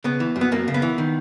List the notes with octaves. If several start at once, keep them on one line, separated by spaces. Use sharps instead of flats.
C#3 B3
E3
F#2
B3
F#2 A#3
C#3
B3
E3
D#3